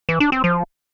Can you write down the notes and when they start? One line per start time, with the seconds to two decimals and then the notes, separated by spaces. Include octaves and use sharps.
0.09 E3
0.20 D4
0.32 C4
0.44 F3